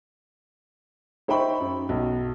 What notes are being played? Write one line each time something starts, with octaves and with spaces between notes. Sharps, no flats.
D#4 C5 E5 G5 B5 C#6
F#2
B1